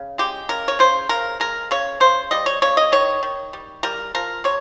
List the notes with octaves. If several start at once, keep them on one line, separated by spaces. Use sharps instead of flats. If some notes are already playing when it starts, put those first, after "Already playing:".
Already playing: C#3
G#3 G4
C#3 A#4
C#5
C#3 C5
C#3 A#4
G#3 A#4
C#3 C#5
C#3 C5
G3 D#5
C#5
C#3 C#5
D#5
D#3 C#5
D#3
G3
G3 A#4
F3 A#4
C3 C#5